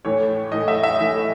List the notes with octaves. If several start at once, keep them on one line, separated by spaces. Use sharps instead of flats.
A2 E3 A3 C#5
A2 E3 A3 D#5
E5
E5
A2 E3 A3